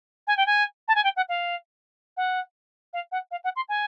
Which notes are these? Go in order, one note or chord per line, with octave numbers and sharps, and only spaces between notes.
G#5
G5
G#5
A5
G#5
G5
F#5
F5
F#5
F5
F#5
F5
F#5
C6
G#5